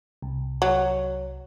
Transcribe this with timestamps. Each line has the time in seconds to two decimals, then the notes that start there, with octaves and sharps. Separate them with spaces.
0.22 C2
0.62 F#3